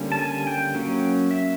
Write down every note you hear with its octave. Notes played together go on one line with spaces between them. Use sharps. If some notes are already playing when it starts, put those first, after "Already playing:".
Already playing: D3 G3 A#3 C#4
A5
G#5
G5
F#3 A#3 C#4
E5